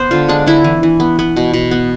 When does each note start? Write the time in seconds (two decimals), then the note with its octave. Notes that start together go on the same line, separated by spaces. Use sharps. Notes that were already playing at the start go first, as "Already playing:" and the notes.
Already playing: B3 C5
0.11 D3 F4
0.28 G#3 D4
0.46 D3 E4
0.64 E3
0.83 E3
1.00 B3
1.19 B3
1.36 B2
1.53 B2
1.71 B3